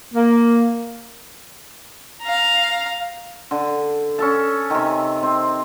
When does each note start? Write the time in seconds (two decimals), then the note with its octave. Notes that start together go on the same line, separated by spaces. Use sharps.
0.14 A#3
2.22 F5 A#5
3.51 D3
4.19 C#4 A4 A5
4.70 C3 D#3
5.23 C4